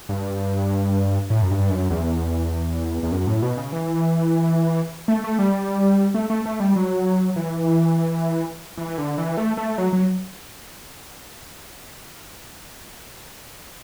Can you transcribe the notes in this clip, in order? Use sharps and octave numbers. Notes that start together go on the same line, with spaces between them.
G2
A2
F#2
G2
F#2
E2
E2
F#2
A2
B2
C#3
E3
A3
A3
G3
A3
A3
A3
G3
F#3
E3
E3
D3
E3
A3
A3
F#3
F#3